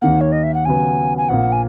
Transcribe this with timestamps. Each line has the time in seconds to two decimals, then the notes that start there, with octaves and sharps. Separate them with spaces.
0.02 D#2 D#3 A#3 F#5
0.21 C#5
0.32 D#5
0.43 E5
0.54 F#5
0.65 D#2 C#3 F#3 B3 G#5
1.18 G#5
1.29 A#1 A#2 A#3 F#5
1.52 G#5